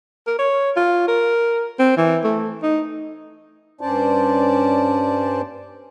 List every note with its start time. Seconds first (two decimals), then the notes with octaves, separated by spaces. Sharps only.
0.27 A#4
0.39 C#5
0.76 F4
1.08 A#4
1.79 C4
1.97 E3
2.24 A3
2.63 D#4
3.81 G2 C#4 C5 D5 A5